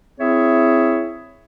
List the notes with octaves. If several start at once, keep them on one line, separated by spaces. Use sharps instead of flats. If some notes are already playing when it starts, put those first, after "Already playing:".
C4 E4 G#4 C#5 E5